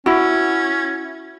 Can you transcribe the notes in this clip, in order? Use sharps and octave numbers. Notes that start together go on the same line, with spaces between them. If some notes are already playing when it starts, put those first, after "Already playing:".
C#4 E4 F#4